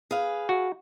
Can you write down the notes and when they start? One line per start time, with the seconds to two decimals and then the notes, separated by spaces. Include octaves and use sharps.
0.11 G#4 B4 F5
0.49 F#4